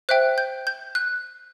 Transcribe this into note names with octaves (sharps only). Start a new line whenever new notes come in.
C5 E5 G5 F#6
G6
G6
F#6